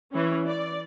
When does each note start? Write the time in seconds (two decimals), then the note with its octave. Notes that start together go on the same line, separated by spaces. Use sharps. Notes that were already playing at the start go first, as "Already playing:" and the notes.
0.12 E3 C#4
0.45 D5